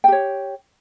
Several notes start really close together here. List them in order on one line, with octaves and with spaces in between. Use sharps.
G5 G4 C#5